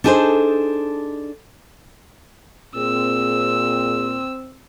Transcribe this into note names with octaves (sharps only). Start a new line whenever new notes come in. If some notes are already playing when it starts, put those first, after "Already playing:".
D4 D#4 G#4 A4 C5
A#2 C4 G#4 E6